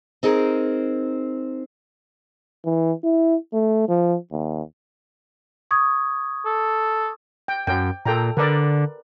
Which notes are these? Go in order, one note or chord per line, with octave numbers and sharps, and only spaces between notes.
C4 D#4 G#4 A#4
E3
E4
A3
F3
D#2
C#6 D#6 G#6
A4
G5
F#2 G5
A#2 A4 G5 A#5
D3 A#4 B4 D5